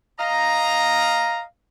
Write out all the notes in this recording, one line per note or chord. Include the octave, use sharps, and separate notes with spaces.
D#5 F5 A#5